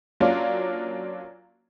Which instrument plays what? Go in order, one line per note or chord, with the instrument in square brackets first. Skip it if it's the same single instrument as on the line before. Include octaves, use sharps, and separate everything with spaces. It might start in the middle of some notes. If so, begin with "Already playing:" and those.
[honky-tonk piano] F#3 A#3 C#4 D4 F4